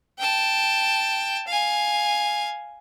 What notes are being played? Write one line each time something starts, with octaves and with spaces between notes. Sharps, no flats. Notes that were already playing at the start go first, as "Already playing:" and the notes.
G5 A5
F5 G#5